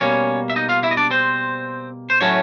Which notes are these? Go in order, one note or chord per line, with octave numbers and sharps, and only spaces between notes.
B2 G3 A#3 C#4 C#5
E5
D#4 D#5
F4 F5
E4 E5
D#5
D4 D5
C4 C5
C5
A2 F#3 A3 C#4 C#5